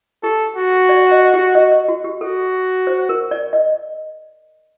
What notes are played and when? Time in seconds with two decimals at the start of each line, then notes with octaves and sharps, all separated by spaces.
0.23 G4 A4
0.56 F#4
0.89 D5
1.11 D#5
1.34 G4
1.55 D#5
1.72 D#5
1.88 F#4
2.04 G4
2.21 F#4 A4
2.87 C5
3.09 A#4
3.31 D5
3.53 D#5